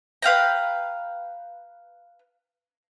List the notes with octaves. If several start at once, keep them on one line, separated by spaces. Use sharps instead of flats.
B4 F5 G5 A#5